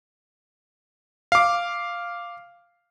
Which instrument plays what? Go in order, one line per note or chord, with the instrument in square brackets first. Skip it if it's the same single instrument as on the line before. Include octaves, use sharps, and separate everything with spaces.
[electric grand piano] F5 D6